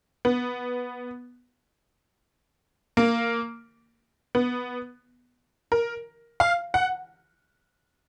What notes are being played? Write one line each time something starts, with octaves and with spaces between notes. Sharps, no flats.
B3
A#3
B3
A#4
F5
F#5